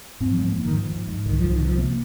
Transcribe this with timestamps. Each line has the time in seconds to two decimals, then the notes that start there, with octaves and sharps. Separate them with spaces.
0.20 G#2 C4
0.31 F3
0.39 G#2 G#3
0.47 A#3
0.56 G#2
0.65 D#3
0.73 G#2 F3
0.90 G#2
1.08 G#2
1.26 C2 D#3
1.39 C2 F3
1.52 D#3
1.61 C3 F3
1.77 C3 A#3